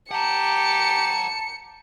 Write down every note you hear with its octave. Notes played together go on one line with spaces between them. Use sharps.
G4 F#5 A5 A#5 C#7